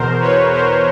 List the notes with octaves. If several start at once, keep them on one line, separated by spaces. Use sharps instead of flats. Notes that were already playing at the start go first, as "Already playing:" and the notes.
Already playing: E2 B2 A#4 C5
B4 C#5
A#4 C5